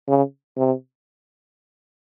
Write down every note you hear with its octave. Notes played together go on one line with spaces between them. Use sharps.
C#3
C3